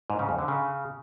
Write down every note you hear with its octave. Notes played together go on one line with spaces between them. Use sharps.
G#2
C#3
F2
D3
C#3